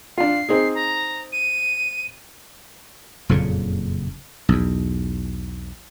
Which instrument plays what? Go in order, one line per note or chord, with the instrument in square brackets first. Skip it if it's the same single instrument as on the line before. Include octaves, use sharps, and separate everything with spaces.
[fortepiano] D4 F4 [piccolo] C7
[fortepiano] C4 D#4 G#4
[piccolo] A#5
D#7
[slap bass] F#1 F2 A#2 C#3
B1 E2